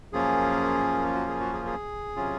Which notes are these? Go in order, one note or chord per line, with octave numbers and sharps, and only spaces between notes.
F#2 F3 A#3 C#4 F4 G#4
F#4
G#4
F#4
G#4
G#4
C3 F#3 C#4 F4